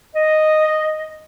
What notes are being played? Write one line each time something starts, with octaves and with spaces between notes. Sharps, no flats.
D#5